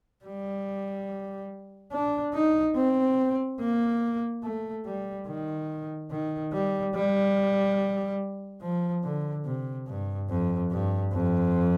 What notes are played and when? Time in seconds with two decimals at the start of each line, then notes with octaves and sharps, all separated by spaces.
0.25 G3
1.92 D4
2.34 D#4
2.76 C4
3.60 A#3
4.43 A3
4.86 G3
5.27 D#3
6.11 D#3
6.53 G3
6.94 G3
8.62 F3
9.04 D3
9.46 C3
9.87 G2
10.30 F2
10.71 G2
11.13 F2